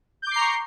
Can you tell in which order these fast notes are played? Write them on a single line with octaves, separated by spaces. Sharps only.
G6 D6 C7 A#5 C#6